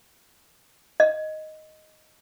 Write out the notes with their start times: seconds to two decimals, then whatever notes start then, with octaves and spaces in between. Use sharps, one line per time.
1.00 D#5